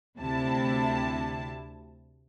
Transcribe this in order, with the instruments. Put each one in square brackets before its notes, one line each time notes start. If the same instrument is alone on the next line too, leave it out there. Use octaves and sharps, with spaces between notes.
[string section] D2 C3 E4 A5